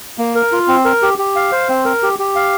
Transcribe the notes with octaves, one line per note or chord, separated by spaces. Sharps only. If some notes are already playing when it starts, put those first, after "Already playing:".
A#3
A#4
F4
C4
A#4
G4
G4
F5
C5
C4
A#4
G4
G4
F5